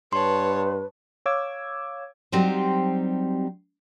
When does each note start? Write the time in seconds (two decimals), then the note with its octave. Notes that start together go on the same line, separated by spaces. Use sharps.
0.13 G2 B4 C#5 A5 C6
1.26 C#5 F5 D6 E6 G#6
2.32 F#3 G3 C4 D#4 G4 C5